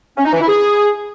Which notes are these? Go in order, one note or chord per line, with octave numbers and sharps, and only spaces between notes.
C#4
D#4
E3
E4
G#4